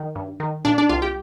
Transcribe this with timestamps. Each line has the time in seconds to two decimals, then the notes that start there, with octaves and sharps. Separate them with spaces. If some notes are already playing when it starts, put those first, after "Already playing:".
Already playing: D#3
0.15 G2
0.40 D#3
0.65 A#2 D4
0.78 D4
0.89 C2 F4
1.02 G4